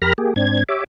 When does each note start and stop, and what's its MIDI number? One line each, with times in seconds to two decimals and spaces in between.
0.02 0.13 41
0.02 0.13 67
0.02 0.13 70
0.02 0.13 83
0.02 0.13 89
0.02 0.13 94
0.18 0.34 58
0.18 0.34 67
0.18 0.34 68
0.36 0.64 44
0.36 0.64 60
0.36 0.64 62
0.36 0.64 92
0.69 0.84 67
0.69 0.84 73
0.69 0.84 76
0.69 0.84 86